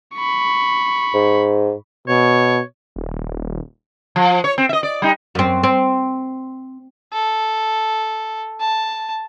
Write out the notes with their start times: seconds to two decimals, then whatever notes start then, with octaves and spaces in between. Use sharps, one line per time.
0.15 B5 C#6
1.14 G#2
2.08 B2 C#5
2.96 D#1
4.16 F3
4.44 C#5
4.58 C4
4.69 D#5 E5
4.83 D5
5.02 G3 D#4
5.35 F#2 C4
5.63 C4
7.13 A4
8.60 A5